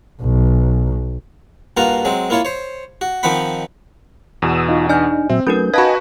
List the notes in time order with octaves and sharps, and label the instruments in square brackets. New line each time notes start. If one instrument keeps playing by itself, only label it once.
[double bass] B1
[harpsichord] G2 A#3 F4 F#4 A#5
F#3 G#3 C4
A#3 E4 F4 C#5
C5 C#5
F#4
D#3 F3 C4 D#4 F#5 B5
[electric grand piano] E2 B2 [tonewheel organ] D#6 E6
[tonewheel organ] D#4 F4
[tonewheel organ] D4 D#4 [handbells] G#5 F6 G6
[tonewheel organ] A#2 F#3 E5 [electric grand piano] C4
[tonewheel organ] F#3 A3 B4 [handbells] C#4 D#4 A#4 [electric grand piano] G6
[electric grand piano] F#4 B4 [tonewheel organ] D#5 G#5 [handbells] F5 A5 B5